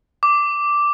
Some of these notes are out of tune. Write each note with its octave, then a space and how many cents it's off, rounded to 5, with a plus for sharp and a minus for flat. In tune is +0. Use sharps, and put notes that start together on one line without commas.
D6 -5